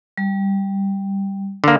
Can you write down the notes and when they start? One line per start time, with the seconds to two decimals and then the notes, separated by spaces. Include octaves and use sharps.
0.18 G3
1.64 D3 A#3